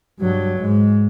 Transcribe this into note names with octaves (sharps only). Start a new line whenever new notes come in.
G2 F#3
G#2